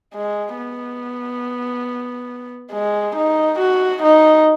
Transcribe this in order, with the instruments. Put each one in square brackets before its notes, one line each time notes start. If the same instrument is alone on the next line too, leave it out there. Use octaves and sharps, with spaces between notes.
[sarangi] G#3
B3
G#3
D#4
F#4
D#4